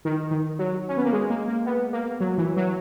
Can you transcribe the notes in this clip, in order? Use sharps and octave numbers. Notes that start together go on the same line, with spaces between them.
D#3
D#3
F#3
C#4
B3
A#3
G#3
A#3
A#3
B3
A#3
F#3
E3
F#3